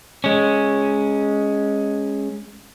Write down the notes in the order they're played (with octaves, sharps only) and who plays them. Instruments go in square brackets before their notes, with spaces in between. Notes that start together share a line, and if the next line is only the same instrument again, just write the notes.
[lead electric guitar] G#3 C#4